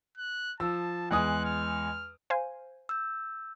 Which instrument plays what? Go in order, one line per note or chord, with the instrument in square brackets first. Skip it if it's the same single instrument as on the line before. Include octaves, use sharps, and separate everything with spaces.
[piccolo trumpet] F#6
[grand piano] F3 E6 [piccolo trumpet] A5
[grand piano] E2 G#3 D#6 [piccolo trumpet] F#6
[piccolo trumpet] F6
[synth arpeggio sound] C5 F5 G#5
[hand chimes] E6 G6